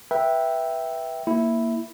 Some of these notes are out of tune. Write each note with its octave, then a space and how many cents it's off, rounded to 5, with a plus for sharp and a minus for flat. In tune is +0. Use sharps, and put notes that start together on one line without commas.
B4 -20 E5 +0 G5 +0
A#3 +0 E4 +0